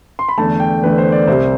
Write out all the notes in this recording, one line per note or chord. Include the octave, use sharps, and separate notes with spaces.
C6
B5
E2 D3 A3 A5
G5
E2 D3 A3 B4
C5
D5
C2 C3 G3 C5